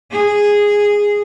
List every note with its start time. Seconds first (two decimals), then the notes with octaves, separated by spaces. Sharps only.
0.12 G#4